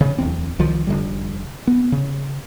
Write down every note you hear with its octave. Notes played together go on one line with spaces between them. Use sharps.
C#3
D1 E2 C4
C2 D#3 F3
F1 D3 G3
B3
C#3